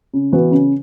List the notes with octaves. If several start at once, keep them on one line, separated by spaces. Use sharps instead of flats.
C#3
E3 B3 F#4 B4
C#3